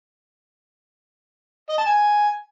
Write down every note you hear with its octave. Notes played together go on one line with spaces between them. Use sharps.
D#5
A5
G#5